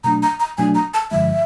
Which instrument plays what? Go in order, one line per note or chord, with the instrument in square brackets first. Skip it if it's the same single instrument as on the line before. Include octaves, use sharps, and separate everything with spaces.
[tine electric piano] B2 F#3 A3 D4 [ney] A#5
[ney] A#5
A#5
[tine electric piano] B2 F#3 A3 D4 [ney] G#5
[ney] A#5
A5
[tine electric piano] G2 D3 F3 G#3 [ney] E5